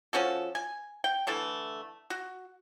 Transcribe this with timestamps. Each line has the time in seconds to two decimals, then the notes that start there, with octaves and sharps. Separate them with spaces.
0.13 F3 C#4 F#4 A4
0.55 G#5
1.04 G5
1.27 D3 E3 A3 A4
2.10 F#4